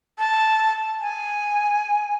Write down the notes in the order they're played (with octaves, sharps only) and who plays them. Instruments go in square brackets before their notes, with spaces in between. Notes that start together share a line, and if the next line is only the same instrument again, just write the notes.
[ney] A5
G#5